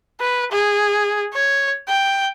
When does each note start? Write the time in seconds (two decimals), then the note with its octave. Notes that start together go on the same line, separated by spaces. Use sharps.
0.21 B4
0.52 G#4
1.34 C#5
1.88 G5